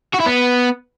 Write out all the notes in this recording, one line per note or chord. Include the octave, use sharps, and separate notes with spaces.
F#4
E4
B3